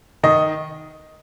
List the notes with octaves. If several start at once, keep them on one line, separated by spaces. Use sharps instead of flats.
D#3 D#5